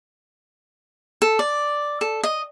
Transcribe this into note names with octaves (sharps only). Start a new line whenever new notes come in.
A4
D5
A4
D#5